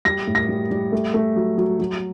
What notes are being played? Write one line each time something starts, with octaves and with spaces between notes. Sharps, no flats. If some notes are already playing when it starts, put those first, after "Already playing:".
G3 A#6
A2
A#6
G3
G3
A3
A3
F#3
F#3
F#3